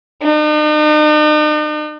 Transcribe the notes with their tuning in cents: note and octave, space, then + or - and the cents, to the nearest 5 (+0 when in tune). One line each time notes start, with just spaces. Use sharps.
D#4 -45